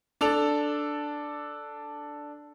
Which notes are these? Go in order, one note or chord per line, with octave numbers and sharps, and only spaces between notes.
D4 A4 F7